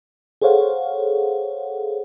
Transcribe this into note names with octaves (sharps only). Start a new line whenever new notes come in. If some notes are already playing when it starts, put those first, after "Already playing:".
G#4 A4 C5 C#5 F5 F#5